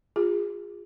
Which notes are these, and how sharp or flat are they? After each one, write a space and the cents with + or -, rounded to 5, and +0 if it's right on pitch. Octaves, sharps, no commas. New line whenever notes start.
F4 +15 G#4 -25